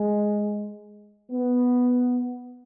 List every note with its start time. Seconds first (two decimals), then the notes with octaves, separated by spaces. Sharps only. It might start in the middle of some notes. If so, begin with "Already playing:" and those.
Already playing: G#3
1.31 B3